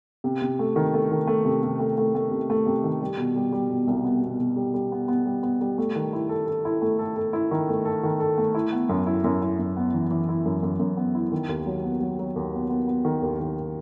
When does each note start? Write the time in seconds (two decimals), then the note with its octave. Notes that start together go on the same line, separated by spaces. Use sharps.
0.24 C3
0.42 C3
0.59 A3
0.76 D#3
0.94 A3
1.11 D#3
1.27 A3
1.45 C3
1.63 C3
1.79 A3
1.98 A3
2.15 A3
2.31 C3
2.50 A3
2.66 C3
2.84 D#3
3.01 G3
3.18 B2
3.36 G3
3.52 G3
3.70 B2
3.87 C2
4.04 B3
4.23 B2
4.40 B2
4.56 G3
4.74 G3
4.92 B3
5.08 B3
5.26 G3
5.43 B3
5.61 G3
5.78 A3
5.96 D#3
6.13 E4
6.29 A4
6.47 A4
6.65 E4
6.82 A3
6.99 A4
7.16 A4
7.33 E4
7.51 D#3
7.69 A3
7.85 A4
8.03 D#3
8.20 A4
8.38 A3
8.55 E4
8.72 B3
8.89 F#2
9.07 E4
9.24 F#2
9.42 E4
9.59 F#2
9.77 B3
9.94 E3
10.11 E3
10.29 E4
10.45 F#2
10.63 F#2
10.80 F#2
10.97 B3
11.15 E4
11.32 D#3
11.49 D#2
11.66 F#3
11.83 B3
12.01 F#3
12.19 F#3
12.36 D#2
12.53 B3
12.70 B3
12.88 B3
13.05 D#3
13.22 D#2
13.39 D#3